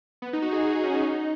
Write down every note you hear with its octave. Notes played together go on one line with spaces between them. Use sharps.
B3
D#4
F#4
G#4
F#4
D#4
C#4
D#4